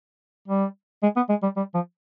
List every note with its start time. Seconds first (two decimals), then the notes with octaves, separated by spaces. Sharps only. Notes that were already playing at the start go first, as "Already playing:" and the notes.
0.48 G3
1.03 G#3
1.16 B3
1.29 G#3
1.43 G3
1.56 G3
1.74 F3